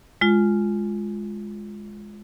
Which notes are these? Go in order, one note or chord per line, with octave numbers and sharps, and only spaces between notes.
G#3 F4